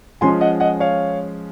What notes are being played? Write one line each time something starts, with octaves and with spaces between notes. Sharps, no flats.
F3 G#3 C#4 G#5 C6
D#5 F#5
D#5 F#5
C#5 F5